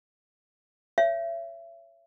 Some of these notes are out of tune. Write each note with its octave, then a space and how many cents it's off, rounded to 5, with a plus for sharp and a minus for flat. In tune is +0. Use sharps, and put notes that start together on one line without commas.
C#5 +0 E5 +30